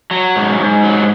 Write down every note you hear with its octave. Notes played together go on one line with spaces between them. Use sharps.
F#3
G#2
G#2
F#3